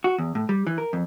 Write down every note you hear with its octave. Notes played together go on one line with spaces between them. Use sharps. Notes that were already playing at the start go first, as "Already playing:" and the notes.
F#4
E2
A2
G3
E3
A#4
F2